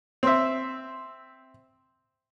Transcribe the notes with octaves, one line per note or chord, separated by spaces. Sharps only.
C4 C5 E5